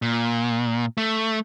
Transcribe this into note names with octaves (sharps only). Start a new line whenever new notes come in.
A#2
A3